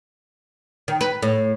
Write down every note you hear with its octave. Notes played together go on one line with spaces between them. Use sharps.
D#3
B4
A2